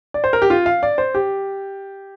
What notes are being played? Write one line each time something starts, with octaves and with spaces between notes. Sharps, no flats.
D5
C5
A#4
G4
F4
F5
D5
C5
G4